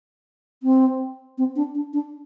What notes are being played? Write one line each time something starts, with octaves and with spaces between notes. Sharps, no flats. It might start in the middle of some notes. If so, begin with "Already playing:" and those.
C4
C4
D4
D4
D4